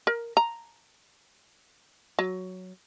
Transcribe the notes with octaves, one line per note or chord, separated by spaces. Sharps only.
A#4
A#5
F#3